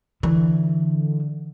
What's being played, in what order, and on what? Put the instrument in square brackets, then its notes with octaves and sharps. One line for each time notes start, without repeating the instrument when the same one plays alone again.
[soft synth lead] D3 [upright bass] E3